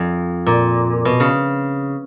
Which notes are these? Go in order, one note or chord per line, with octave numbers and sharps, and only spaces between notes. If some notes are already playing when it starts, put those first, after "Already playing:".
Already playing: F2
A#2
B2
C#3